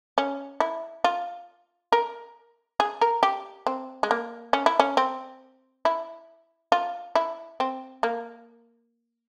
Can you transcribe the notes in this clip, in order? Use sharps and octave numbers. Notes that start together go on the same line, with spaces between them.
C#4
E4
F4
A#4
G#4
A#4
G4
C4
G#3
A#3
C#4
E4
C#4
C4
E4
F4
E4
C4
A#3